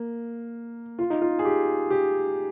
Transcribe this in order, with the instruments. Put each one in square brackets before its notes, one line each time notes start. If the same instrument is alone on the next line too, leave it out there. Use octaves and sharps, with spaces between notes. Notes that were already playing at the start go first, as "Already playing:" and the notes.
Already playing: [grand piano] A#3
F4
D#4
F4
G#4
G4
G4